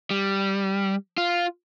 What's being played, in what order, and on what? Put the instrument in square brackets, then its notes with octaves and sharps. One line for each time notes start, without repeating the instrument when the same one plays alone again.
[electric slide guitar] G3
F4